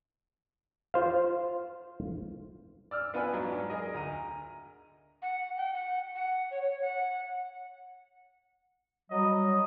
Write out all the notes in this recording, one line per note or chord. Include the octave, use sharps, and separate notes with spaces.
F4 C5 F5
D5 E6 F6
B3 D4 F4 B4 G#5
G#2 F#3 D4
G#4 A#4 D#5
D2 A#5 D#7
F#5
G5
F#5
F#5
C#5
C#5
F#5
F#3 G3 D#5